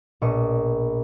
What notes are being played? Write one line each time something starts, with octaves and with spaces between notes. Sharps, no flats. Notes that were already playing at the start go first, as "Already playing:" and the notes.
A#1 B2 D#5 C#6